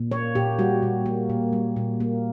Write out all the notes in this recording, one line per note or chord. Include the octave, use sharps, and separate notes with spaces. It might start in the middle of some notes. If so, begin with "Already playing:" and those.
Already playing: A#2
A#3 C#5
A#2 G4
G3 F#4
A#2
A#3
A#2
G3
A#2
A#3